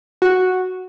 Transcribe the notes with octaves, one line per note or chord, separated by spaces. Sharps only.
F#4